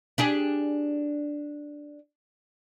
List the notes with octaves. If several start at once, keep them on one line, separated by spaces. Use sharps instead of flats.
D4 G4 G#4